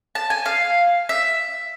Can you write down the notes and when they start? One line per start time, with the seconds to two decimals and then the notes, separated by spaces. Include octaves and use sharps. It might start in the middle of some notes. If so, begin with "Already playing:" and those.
0.15 A5
0.30 G#5
0.46 F5
1.09 E5